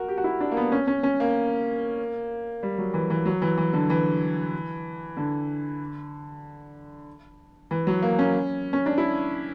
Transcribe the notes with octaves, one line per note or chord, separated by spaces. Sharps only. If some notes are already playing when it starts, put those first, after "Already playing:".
Already playing: F#4 A#4
G4
F#4
E4
D4
A#3
B3
C#4
C#4
C#4
A#3
G3
F#3
E3
E3
F#3
E3
E3
D3
E3
D3
E3
F#3
A#3
C#4
C#4
D4
E4